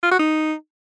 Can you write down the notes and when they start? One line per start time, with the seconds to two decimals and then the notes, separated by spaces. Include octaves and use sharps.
0.03 F4
0.11 F#4
0.19 D#4